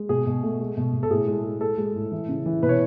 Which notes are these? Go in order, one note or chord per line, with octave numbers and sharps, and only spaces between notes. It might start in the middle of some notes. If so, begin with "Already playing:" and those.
Already playing: G#3
B2 G#4
B2
A3
G#3
B2
B2
A4
A2 G#4
G#3
G#3
G#3 A4
G#3
A2
E3
C#3
E3
B2 B4
C#5